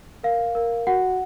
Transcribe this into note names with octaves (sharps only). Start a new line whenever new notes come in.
A#4 F5
A#4
F#4 F#5